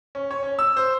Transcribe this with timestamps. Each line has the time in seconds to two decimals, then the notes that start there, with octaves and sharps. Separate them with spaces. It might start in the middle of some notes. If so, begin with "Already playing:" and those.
0.15 C#4
0.31 C#5
0.43 C#4
0.59 E6
0.77 C5